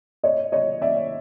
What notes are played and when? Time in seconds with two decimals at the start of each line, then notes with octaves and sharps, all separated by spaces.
0.24 C#5 D#5
0.52 C#5 D#5
0.81 D5 E5